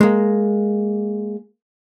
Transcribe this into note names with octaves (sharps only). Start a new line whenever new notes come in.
G#3 A#3